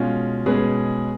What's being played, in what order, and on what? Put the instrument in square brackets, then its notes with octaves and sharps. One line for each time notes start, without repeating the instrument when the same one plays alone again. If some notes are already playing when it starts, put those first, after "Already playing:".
Already playing: [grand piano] B2 G#3 C#4 F4
B2 G#3 C#4 G#4 B4